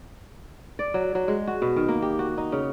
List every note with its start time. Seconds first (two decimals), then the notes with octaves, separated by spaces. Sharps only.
0.79 D5
0.94 F#3
1.15 F#3
1.28 G#3
1.47 F#4
1.62 B2
1.76 D#3
1.88 A#3
2.02 G4
2.19 F#4
2.38 D#4
2.52 C#3